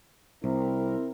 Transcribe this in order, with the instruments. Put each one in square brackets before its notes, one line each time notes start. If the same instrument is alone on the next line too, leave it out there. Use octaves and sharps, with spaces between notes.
[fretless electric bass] C2 [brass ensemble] C4 E4 A#4